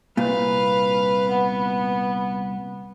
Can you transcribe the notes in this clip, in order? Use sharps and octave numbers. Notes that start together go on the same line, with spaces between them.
C2 A#2 B4 F5
B3